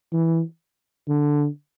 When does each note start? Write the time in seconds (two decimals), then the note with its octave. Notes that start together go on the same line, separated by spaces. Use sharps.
0.13 E3
1.08 D3